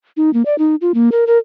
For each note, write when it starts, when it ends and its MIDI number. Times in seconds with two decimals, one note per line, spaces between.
0.17 0.33 63
0.34 0.43 58
0.46 0.58 74
0.58 0.75 63
0.81 0.92 65
0.94 1.10 58
1.12 1.25 70
1.27 1.38 70